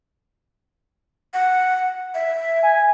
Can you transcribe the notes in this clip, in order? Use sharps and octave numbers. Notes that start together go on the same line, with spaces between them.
F#5
E5
G#5